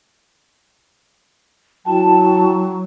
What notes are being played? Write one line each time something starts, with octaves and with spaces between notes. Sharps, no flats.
F#3 E4 F#4 G5 A5